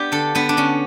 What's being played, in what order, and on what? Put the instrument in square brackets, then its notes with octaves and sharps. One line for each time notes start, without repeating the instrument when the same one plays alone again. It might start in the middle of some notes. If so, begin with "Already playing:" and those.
Already playing: [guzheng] B3 D4 G4
D3 A4
D3 B3
D4
D3 C#4